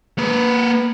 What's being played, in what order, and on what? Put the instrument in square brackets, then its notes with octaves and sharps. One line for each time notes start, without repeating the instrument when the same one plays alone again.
[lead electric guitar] A#3 B4